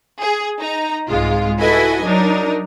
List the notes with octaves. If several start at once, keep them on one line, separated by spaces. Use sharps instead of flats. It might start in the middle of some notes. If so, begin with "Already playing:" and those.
G#4
D#4 A#5
C2 G#2 G#3 F4
E4 F#4 A4 B4 D#5 G#5
F#3 D4 D#4 A#4